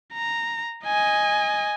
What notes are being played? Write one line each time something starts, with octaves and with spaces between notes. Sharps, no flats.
A#5
D#5 G#5